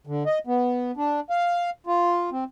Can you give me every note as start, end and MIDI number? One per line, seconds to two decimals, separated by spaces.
0.07 0.23 50
0.26 0.39 75
0.47 0.91 59
0.97 1.20 62
1.30 1.70 77
1.87 2.30 65
2.32 2.44 60